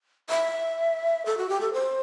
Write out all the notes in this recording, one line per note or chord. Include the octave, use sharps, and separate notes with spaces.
E5
A4
F#4
G4
A4
C5